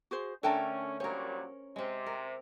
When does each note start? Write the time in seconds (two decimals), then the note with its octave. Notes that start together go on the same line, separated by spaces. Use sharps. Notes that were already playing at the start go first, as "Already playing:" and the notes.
0.11 F#4 G#4 C5
0.43 D3 A3 C#4 A4 A#4 G5 A5
1.00 A#2 F#3 G3 C#4 A#4 C5 C#5
1.76 C3 G#3 C4
2.06 A#4